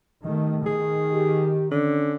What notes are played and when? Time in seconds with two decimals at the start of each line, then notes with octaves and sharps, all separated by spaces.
0.24 D#3 A3 B3 G4 D#5
0.66 D#3 G#4
1.12 G4
1.71 D3 C#4